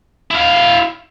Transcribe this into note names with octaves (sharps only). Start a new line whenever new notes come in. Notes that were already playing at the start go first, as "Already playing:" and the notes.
E4 F5